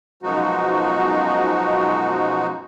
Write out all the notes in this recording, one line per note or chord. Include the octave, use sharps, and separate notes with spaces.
F#2 B2 F3 G#3 D#4 F#4